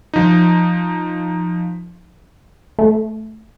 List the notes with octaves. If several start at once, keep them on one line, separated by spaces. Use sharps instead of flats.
F3 D#4
A3